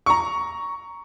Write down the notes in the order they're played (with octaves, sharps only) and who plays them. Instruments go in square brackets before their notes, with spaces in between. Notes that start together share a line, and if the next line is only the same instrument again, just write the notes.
[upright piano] A#5 C#6